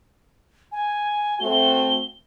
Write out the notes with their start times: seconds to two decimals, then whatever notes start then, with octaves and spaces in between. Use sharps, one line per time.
0.72 G#5
1.40 A3 C4 F#4 G7